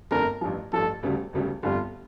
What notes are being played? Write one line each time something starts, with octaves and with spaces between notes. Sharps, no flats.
G1 F2 D3 A3 D4 A#4
A1 G2 F3
A1 G2 F3 A4
E1 D2 C#3 G3
E1 D2 C#3 G3
G1 F2 D3 G3 F4